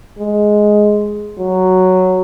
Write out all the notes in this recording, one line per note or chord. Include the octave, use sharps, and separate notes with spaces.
G#3
F#3